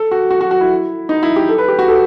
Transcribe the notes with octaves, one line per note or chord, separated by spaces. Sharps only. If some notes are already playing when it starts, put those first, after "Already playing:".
Already playing: A4
F#4
F#4
F#4
F#4
E4
D#4
E4
G4
A4
B4
G4
F#4
A4